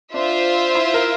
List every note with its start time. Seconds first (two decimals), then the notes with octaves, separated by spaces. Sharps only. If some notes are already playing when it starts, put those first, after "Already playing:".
0.14 D4 F4 C5 E5
0.75 E4
0.94 A#4